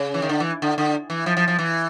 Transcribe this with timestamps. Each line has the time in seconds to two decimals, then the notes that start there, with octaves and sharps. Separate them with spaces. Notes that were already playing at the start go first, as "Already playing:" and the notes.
Already playing: C#3
0.14 E3
0.22 D#3
0.29 D3
0.40 E3
0.62 D3
0.78 D3
1.10 E3
1.26 F3
1.37 F3
1.48 F3
1.59 E3